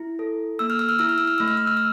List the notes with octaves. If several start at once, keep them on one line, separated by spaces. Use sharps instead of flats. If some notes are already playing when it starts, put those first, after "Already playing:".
Already playing: E4
A4
A#3 E6
F6
E6
F6
E4 E6
F6
E6
F6
A3 E6
F6
E6
F6
E6